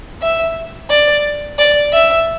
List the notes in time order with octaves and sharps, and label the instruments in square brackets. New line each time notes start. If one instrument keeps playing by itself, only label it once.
[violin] E5
D5
D5
E5